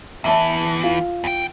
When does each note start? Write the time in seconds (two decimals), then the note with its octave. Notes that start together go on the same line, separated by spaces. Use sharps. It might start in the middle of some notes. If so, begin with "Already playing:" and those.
0.24 E2 E3 E5 A5
0.84 F4
1.24 E2 G5